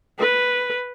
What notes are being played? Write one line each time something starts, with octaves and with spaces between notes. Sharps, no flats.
B4